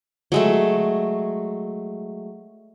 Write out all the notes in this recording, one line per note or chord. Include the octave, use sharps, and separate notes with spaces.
F#3 G#3 A3